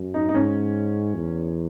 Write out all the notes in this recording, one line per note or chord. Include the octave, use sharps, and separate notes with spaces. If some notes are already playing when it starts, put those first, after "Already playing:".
Already playing: F#2
D#4
D#4
G#2 C#4
E2